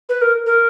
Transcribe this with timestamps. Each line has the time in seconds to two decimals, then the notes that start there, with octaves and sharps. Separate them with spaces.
0.09 B4
0.22 A#4
0.46 A#4